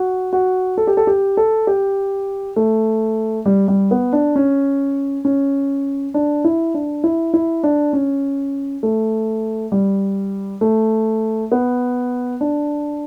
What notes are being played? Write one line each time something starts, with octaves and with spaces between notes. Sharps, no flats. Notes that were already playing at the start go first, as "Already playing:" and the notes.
Already playing: F#4
F#4
A4
G4
A4
G4
A4
G4
A3
G3
G3
B3
D4
C#4
C#4
D4
E4
D4
E4
E4
D4
C#4
A3
G3
A3
B3
D4